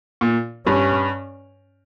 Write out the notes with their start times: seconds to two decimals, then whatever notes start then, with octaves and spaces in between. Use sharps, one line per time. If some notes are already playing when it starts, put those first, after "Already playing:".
0.21 A#2
0.67 G2 C#4